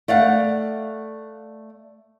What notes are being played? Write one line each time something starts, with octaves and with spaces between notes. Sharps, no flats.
A3 D5 F5 F#5